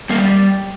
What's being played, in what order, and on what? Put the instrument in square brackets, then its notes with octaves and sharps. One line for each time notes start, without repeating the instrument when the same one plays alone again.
[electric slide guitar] G3 A#3